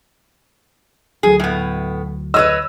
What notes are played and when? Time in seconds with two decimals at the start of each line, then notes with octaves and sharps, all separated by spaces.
1.23 D2 F#3 G#4
1.40 A2 B3
2.34 B4 C#5 D#5 E6